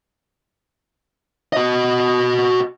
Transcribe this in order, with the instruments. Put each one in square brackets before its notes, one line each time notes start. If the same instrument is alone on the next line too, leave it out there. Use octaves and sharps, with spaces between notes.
[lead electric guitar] F#4 D#5